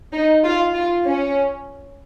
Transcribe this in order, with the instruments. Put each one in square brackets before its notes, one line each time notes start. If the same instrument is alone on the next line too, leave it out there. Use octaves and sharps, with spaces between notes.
[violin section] D#4
F4
F4
C#4